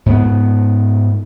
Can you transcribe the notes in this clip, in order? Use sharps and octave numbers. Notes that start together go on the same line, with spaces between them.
G#2 B3